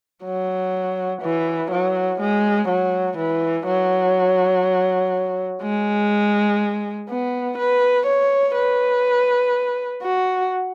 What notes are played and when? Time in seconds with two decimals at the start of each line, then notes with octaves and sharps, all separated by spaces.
0.25 F#3
1.22 E3
1.71 F#3
2.21 G#3
2.69 F#3
3.18 E3
3.67 F#3
5.63 G#3
7.10 B3
7.59 B4
8.07 C#5
8.55 B4
10.03 F#4